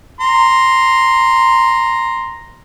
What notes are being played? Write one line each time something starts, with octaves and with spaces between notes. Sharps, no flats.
A#5 C6